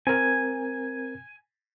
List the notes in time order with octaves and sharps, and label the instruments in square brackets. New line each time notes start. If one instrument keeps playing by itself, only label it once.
[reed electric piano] C4 A#4 [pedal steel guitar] G#5